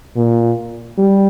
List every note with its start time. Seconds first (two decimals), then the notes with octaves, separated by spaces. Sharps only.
0.16 A#2
0.98 G3